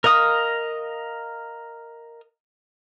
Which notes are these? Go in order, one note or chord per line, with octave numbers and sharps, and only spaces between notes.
A#4 D#5 F5 D#6